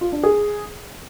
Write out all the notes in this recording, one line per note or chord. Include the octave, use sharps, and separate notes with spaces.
F4
D4
G#4